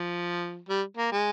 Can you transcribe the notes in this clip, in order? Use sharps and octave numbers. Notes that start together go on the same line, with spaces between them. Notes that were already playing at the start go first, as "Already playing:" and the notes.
Already playing: F3
G3
A#3
G#3